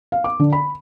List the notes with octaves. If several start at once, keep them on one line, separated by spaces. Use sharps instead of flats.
F5
D6
D3
B5